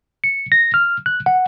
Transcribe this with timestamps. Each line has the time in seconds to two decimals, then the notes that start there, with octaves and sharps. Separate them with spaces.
0.24 C#7
0.52 A#6
0.74 F6
1.06 F#6
1.26 F#5